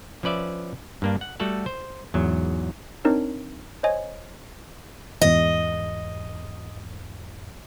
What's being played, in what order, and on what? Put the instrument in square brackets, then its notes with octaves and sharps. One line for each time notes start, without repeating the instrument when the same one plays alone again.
[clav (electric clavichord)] F3 C#4 B4 D5 E5
G2 A#3 D4
F#5
G3 A3 F#4 A4 F#5
C5
E2 G#2 F#3
[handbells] C4 D4 D#4 A#4 C#5
C5 C#5 D#5 G#5 G#6
[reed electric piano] E2 G#2 [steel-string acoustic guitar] D#5